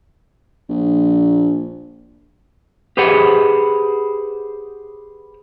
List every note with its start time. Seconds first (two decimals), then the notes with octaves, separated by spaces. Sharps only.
0.69 A#1
2.97 G4 G#4 B4 C5 F#5